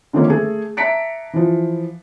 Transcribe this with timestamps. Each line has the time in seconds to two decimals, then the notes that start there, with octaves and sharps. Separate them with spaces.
0.13 D3 D#3 F3 A3 A#3 C#4
0.30 A3 G#4 A4
0.77 E5 A5 A#5 B6 C#7 D7
1.33 E3 F3